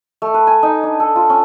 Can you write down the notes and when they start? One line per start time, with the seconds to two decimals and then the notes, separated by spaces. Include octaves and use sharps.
0.22 A3
0.34 B4
0.47 G#5
0.63 D#4
0.83 D4
1.00 A4
1.16 F4
1.30 C#4